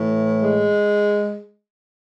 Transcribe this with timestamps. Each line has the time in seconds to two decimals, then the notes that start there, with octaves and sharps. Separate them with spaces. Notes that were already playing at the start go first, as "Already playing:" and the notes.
Already playing: A2 E3
0.41 G#3